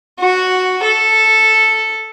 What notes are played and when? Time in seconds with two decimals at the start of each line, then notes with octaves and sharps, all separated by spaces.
0.20 F#4
0.83 A4